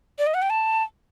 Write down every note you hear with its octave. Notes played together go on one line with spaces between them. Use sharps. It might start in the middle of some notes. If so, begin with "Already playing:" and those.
D5
D#5
F#5
G5
A5